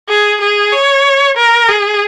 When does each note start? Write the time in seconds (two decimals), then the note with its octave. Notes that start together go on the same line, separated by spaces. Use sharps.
0.09 G#4
0.41 G#4
0.73 C#5
1.37 A#4
1.69 G#4